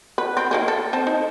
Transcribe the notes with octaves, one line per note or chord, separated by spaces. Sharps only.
B4
C4
D#3 A#3 G#4
A4
C4 C5 A5
D#4